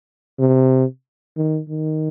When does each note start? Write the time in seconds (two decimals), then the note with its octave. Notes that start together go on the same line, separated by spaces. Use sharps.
0.39 C3
1.37 D#3
1.69 D#3